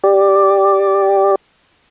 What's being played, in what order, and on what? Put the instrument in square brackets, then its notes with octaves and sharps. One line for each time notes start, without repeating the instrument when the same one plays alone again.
[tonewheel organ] G4 D5